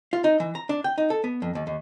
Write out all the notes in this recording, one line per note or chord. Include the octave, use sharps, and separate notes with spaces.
F4
D#4
E3
A#5
D4
G5
D#4
A4
B3
F2
D#2
D#2